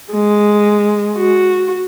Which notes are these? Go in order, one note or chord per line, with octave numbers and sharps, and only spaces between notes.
G#3
F#4